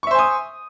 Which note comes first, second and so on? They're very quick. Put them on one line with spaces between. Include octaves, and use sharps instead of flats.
C#6 E5 C5 G#5 D#6